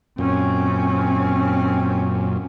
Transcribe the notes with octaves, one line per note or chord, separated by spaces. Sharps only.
F#2 A#2 C4 C#4